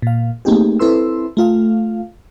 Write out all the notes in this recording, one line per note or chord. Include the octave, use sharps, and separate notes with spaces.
A#2 F5
A3 A#3 C4 D#4 G4 G#4
C4 E4 A4 B4 C6 E6
A3 F4 F5